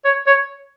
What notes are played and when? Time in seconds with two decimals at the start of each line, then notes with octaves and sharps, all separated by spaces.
0.05 C#5
0.27 C#5